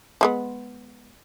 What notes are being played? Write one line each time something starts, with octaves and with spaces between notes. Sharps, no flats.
F3 G#3 B3